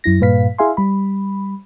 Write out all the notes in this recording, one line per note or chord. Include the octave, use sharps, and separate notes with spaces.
F#2 E4 A#6
G2 A#2 B4 F5 B6
E4 G#4 E5 F5 G#5 C6
G3 B5